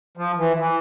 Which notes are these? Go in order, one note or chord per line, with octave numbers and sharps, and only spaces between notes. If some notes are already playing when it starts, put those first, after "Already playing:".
F3
E3
E3